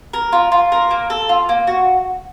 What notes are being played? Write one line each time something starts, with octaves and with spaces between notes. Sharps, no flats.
A#4
F4
F4
A#4
A#3
A4
F4
A#3
F#4